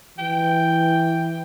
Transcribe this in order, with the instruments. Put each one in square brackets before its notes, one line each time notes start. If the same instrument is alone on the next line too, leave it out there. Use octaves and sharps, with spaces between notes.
[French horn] E3 [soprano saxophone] G5